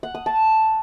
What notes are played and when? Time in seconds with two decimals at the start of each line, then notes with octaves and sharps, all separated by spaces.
0.03 F#5
0.15 D#6
0.26 A5